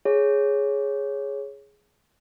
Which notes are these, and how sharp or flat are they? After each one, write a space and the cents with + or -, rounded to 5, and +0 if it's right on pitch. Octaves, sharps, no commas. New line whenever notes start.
G#4 +5 C#5 +0